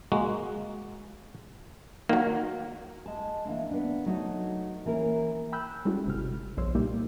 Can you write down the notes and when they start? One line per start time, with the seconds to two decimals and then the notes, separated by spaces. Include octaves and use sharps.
0.12 G#3 A#3 F#4
2.09 D#3 F#3 A#3
3.06 G#3 A5
3.45 E3 A#3 C4 D4
3.71 B3 D4
4.06 F#3 A3 D#4 F#4
4.86 E3 A#3 C#4 A#4
5.52 G5 G#5 B5 E6 F#6 G6
5.85 G3 G#3 C#4 E4 F#4 A4
6.06 G1 C3 F6
6.57 B1 G2 F3 C5 C#5 E6
6.75 A#2 G3 A#3 D#4 E4 G4